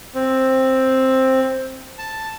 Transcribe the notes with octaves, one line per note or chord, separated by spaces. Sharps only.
C4
A5